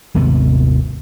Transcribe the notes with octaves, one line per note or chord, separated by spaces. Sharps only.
G#1 D#2 C3 B3